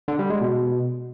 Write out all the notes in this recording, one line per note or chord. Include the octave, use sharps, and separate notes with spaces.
D3
G3
G#3
B2